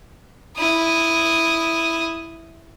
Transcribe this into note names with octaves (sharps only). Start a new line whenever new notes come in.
E4 D#6